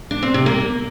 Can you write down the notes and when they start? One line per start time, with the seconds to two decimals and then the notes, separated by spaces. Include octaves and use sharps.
0.11 D4
0.23 C4
0.34 C3
0.46 A#3